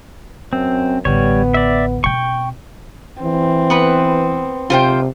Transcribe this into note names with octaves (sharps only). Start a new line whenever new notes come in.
F#2 C4
A1 D3 G3 B3 C#5
D5 E5
B2 C4 G5 C#6
E3 C4
B3 B4
C3 F4 C5 G5